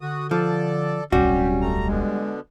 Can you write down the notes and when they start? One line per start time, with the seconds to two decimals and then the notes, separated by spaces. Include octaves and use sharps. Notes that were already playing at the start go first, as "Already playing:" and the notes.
0.01 D3 F#4 D#6
0.31 F3 A4 D5
1.12 D1 B1 G3 C#4 F#4 G4
1.61 A3 A#5
1.88 B2 D3 G#3